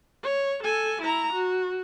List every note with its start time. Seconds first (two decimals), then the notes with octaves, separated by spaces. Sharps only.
0.23 C#5
0.63 A4 G#5
1.02 E4 A#5
1.33 F#4